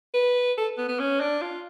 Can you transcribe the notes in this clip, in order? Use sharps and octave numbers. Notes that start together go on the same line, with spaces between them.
B4
A4
B3
B3
C#4
D4
F4